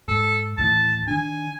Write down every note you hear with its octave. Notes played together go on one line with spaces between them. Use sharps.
G#2 A4
D#2 A2 E3 A5
D#3 D4 G#5